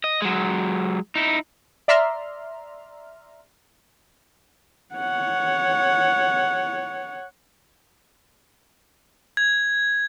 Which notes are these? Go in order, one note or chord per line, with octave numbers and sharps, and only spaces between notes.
D#5
F#3 G#3
D#4 E4
D5 E5 A#5 C6 F6
C#5 F#5
G#6